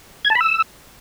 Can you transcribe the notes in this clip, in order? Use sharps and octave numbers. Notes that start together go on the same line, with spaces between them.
G#6
A5
B5
E6